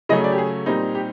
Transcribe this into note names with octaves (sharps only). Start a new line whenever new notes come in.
C#3 F#3 A3 C#4 D#5
D5
G4
G#4
A#2 G3 C4 D#4
G4